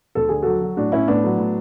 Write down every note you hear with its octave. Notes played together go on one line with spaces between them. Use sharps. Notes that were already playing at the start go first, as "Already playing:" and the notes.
D2 A4
D3 G#4
F#3 F#4 A4
F#3
A2 D4 F#4
A2 C#4 E4
A2 B3 D4
F#3
A2